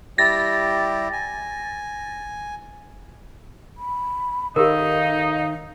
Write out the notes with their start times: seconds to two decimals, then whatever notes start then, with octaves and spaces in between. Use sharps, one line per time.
0.18 G3 E4 G4 A6 A#6
1.13 G#5
3.77 B5
4.56 A2 D#3 D#4 G4 A#4 F5